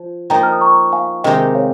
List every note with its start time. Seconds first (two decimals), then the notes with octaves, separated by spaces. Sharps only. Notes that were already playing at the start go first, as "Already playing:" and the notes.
Already playing: F3
0.30 F3 A#3 D#4 G5 A#5
0.43 F6
0.52 D#6
0.61 A#5 C#6
0.92 F5 G#5
1.24 C3 D#3 G#3 D#4 G4 D#5 G5
1.55 C#5 F5